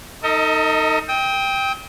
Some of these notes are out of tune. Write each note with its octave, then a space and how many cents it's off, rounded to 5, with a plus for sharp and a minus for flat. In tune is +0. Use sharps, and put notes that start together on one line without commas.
D#4 +0 A4 +45 D#5 +30
G5 +5 D#6 +45